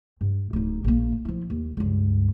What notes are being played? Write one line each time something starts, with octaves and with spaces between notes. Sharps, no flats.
G2
D1 D#4
A#1 A#3
F3 E4
D#2
C#2 G2